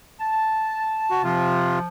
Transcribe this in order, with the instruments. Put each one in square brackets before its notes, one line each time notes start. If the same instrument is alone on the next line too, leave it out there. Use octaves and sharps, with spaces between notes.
[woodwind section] A5
[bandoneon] F#4
[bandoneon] C3 F4 [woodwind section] F3